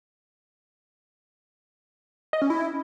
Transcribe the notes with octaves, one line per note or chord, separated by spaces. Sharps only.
D#5
C#4
E4